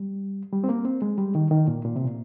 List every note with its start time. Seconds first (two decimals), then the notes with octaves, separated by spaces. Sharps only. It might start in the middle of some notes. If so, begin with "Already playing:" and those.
Already playing: G3
0.52 G3
0.64 C4
0.69 A#3
0.85 C4
1.02 G#3
1.18 G3
1.35 D#3
1.51 D#3
1.68 A#2
1.85 A#2
1.96 C3
2.05 A#2